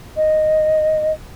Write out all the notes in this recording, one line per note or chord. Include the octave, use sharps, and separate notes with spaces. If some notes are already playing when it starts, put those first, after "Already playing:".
D#5